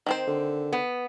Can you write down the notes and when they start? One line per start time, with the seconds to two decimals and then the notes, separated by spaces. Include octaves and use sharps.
0.06 D#3 C4 C5
0.27 D3
0.73 B3